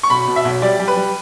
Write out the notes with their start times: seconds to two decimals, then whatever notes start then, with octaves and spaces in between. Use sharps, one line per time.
0.03 C#6
0.10 B1 B5
0.27 B2
0.36 E5
0.45 B1
0.62 G3 D5
0.79 G3
0.88 B4
0.96 G3